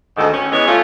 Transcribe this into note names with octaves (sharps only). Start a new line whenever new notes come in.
D2 G#2 D#3 A4
C#4
E3 G#3 B3 C#5
A3 C#4 F4